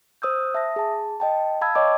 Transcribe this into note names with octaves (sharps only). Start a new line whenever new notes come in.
C5 D#6 E6 G6
E5 A5 D#6 A#6
G#4 A5
D#5 G5 A5
F5 A5 B5 D#6 E6 G#6
C#5 D#5 G5 C#6 D6